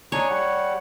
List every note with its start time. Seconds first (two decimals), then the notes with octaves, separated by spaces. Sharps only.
0.12 D4 D#4 C#5 G#5
0.30 G3 F#5